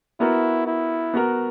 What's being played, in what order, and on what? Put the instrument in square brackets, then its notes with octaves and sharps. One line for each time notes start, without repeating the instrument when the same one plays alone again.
[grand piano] B3 F#4 A#4 [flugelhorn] E4
[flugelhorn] E4
[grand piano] B3 F#4 A#4